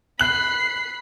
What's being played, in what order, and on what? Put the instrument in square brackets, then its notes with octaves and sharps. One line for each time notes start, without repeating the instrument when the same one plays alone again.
[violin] B5 C7 [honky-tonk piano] F#6 F#7